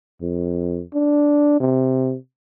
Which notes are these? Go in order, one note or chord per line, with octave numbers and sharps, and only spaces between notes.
F2
D4
C3